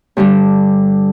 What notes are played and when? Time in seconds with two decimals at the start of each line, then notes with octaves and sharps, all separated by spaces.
0.17 G2 D3 G3